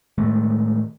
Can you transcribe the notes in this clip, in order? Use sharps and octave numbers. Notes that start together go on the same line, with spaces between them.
A2 D#3 G#3 A3